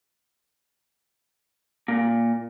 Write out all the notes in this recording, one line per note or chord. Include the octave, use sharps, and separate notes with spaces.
A#2